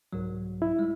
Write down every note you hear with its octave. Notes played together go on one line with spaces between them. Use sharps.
C2 G#2 F#3
E4
G3 G#3